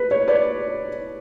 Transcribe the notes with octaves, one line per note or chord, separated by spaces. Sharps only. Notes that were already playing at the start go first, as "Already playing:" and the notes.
Already playing: B4
C#5
B4 D5